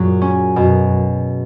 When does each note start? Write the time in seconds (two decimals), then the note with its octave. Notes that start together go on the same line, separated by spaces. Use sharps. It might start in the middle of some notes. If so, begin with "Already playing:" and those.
Already playing: F#2 A#2 F#3 G#4
0.22 C#4
0.56 F#2 B2